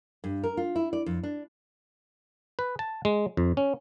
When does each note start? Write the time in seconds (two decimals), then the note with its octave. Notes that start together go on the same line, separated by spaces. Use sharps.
0.24 G2
0.44 A#4
0.57 F4
0.76 E4
0.93 D5
1.06 F2
1.24 D4
2.59 B4
2.79 A5
3.05 G#3
3.37 F2
3.57 C#4